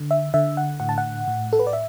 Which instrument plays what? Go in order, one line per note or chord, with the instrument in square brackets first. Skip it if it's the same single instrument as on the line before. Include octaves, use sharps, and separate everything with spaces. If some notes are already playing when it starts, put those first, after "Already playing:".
Already playing: [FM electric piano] D3
E5
D3 E5
F#5
A2 F#5
A5
F#5
A2
A4
B4
D5
E5